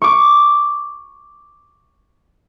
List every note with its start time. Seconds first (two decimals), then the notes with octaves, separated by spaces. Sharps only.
0.02 C#6 D6